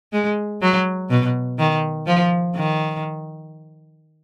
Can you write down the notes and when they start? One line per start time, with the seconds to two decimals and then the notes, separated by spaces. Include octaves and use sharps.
0.12 G#3
0.62 F#3
1.10 B2
1.59 D#3
2.07 F3
2.56 D#3